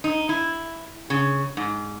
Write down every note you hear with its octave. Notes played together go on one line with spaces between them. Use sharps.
D#4
E4
C#3
G#2